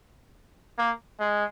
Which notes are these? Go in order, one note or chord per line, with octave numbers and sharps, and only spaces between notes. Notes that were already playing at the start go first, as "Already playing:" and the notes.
A#3
G#3